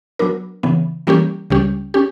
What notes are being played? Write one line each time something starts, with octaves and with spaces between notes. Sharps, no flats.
F#3 B3 D4 A#4
C#3 E3 B3
E3 G3 A#3 C#4 G4
C#2 C#3 G3 C#4 G4
C#4 G4